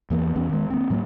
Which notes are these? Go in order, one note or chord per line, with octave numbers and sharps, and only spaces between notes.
E2 E3 A#3
E2 E3 B3 C#4
D#3 G#3
A#3 C4
A2 F#3 G#3 A#3